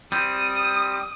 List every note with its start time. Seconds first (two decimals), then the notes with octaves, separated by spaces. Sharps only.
0.12 G3 C4 D#6